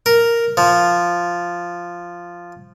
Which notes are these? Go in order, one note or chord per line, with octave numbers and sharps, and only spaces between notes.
A#4
F3